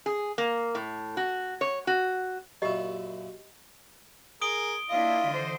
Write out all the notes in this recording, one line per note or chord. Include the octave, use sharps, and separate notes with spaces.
G#4
A#3
A2
F#4
C#5
F#4
F#2 A#2 E4 G4 D#5
G#4 A#4 D#6 D7 G7
A#3 D4 E4 F4 D#5 F5
D3 E3 C5